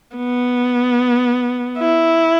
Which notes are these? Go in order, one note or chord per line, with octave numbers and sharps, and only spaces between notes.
B3
E4